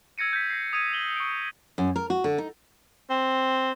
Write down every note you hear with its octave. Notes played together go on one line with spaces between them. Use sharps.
E6 G#6 A#6 C#7 D#7
G6 B6
A#6 C7
D#6 G#6 D#7
B6 F#7 G7
C#6 D7
F#2
A#4
F#4
D3
D#4
C4